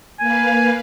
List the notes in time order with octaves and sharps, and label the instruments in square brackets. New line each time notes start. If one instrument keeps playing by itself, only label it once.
[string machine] A#3 B4 F5 [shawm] G#5